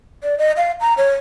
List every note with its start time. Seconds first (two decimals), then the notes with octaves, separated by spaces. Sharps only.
0.23 D5
0.38 D#5
0.57 F5
0.81 A#5
0.98 C#5